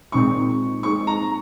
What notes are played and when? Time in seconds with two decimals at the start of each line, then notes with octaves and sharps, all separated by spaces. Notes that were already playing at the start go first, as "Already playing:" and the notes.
0.12 A#2 G#3 C4 D#4 C#6
0.83 A#2 G#3 C4 D#4 C#6
1.07 A#5